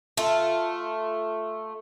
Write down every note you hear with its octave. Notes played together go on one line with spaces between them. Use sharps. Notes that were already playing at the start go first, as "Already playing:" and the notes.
A3 F4